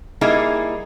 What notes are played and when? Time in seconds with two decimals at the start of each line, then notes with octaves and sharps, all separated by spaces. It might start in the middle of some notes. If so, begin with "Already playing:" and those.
0.21 G3 A#3 D#4 E4 G#4